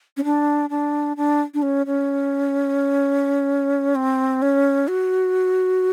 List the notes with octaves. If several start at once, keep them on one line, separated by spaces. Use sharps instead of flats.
C#4
D4
D4
D4
D4
C#4
C#4
C4
C#4
F#4